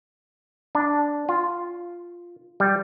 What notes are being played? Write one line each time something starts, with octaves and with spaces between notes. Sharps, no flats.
D4
F4
G3